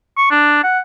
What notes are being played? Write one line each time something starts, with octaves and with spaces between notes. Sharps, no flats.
C#6
D4
F#5